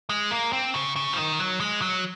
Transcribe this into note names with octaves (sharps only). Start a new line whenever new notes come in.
G#3
A#3
C4
C#3
C#3
F3
D#3
F#3
G#3
F#3